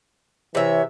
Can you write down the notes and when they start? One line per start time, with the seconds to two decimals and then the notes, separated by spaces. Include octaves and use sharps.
0.55 C3 E3 C#5 E5